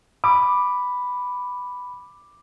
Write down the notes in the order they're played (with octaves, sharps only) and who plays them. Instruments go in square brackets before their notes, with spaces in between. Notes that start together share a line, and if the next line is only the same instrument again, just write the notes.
[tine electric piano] B5 [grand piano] D6